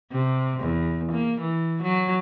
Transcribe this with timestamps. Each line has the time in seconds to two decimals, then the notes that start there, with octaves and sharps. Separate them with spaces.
0.12 C3
0.60 E2
1.12 A#3
1.40 E3
1.83 F#3